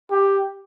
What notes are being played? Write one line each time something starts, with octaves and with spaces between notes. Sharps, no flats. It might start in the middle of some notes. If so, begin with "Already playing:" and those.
G4